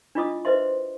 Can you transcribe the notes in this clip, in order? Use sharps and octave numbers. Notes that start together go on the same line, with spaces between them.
D4 E4 F4 D#5 D6 D#6
B4 C5 D#5 E5 C6